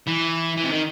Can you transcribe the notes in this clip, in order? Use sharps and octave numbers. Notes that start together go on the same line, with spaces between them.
E3
E3
C3
D#3